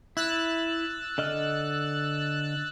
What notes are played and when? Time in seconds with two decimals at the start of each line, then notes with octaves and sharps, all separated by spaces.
0.17 E4 E6 F#6 A6
1.18 D3 D#5 F6